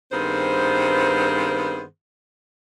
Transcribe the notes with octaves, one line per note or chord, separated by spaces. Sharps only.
G2 D#3 B3 C4 G#4 C5